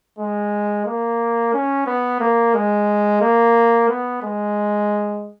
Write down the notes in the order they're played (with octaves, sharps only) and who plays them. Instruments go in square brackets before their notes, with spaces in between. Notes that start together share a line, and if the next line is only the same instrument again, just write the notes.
[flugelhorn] G#3
A#3
C#4
B3
A#3
G#3
A#3
B3
G#3